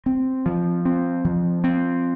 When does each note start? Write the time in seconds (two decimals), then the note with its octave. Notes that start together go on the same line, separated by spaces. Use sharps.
0.06 C4
0.46 F3
0.85 C4
1.25 F3
1.64 C4